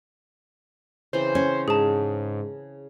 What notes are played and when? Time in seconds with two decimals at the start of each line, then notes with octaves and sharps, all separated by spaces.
1.13 C#3 E3 C4 C5
1.35 C#4
1.68 G#2 G#4 A5